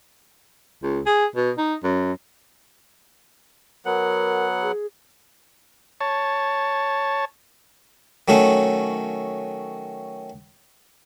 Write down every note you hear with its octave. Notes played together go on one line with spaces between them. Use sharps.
C#2
G#4
B2
D#4
F#2
F#3 B3 A#4 F#5
G#4
C#5 A5
D#3 F#3 A3 C#4